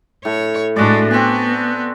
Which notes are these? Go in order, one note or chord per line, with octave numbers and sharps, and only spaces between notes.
A2 C#5
A2 G#3 D4 F#4 D5
B3 C4 G#5